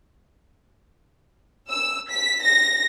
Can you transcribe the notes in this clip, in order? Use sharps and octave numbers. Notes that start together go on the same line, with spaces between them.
E6
B6
A#6